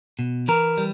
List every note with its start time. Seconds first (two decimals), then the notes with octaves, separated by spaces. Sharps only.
0.19 B2
0.48 E3 A#4
0.78 G3